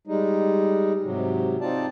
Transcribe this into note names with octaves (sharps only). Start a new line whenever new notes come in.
G3 G#3 D#4
G#2 C3 F#3
C4 D#4 F4 D5 A5